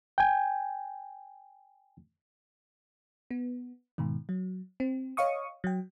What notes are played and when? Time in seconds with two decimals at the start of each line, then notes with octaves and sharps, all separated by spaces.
0.18 G5 G#5
3.31 B3
3.98 G#2 B2 D#3
4.29 F#3
4.80 C4
5.17 C#5 D#5 F5 C#6 D#6
5.64 F#3 G5